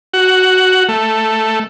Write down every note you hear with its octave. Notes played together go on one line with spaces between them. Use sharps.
F#4
A3